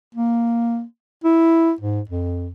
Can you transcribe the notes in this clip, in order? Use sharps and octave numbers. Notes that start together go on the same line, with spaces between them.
A#3
E4
G#2
F2